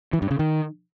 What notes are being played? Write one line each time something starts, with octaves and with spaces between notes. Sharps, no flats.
E3
G2
C#3
D#3